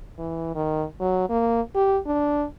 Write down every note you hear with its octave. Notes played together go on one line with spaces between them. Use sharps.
E3
D#3
F#3
A#3
G4
D4